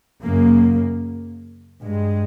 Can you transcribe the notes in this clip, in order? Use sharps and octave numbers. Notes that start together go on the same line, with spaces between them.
F#2 C#3 A#3
G2 G#3